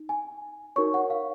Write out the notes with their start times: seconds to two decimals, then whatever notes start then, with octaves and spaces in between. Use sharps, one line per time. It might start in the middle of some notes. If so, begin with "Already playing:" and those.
Already playing: D#4
0.09 G#5
0.76 D#4 F#4 A#4 C#5 C#6
0.94 F#5
1.10 F5